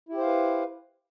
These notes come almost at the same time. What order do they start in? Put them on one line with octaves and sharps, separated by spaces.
E4 G4 C5 F5 B4